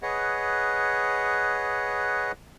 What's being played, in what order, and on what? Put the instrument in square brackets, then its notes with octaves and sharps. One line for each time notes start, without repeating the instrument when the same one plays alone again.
[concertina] G#4 B4 C#5 D#5 F#5